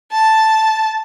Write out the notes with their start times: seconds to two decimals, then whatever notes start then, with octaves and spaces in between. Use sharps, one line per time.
0.12 A5